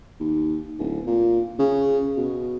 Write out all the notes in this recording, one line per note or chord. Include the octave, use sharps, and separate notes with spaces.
D#2
D1
A#2
C#3
B2